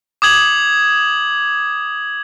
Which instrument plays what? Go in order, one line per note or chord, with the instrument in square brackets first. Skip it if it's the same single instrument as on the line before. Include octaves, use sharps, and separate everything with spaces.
[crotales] D6 D#6 G#6 F#7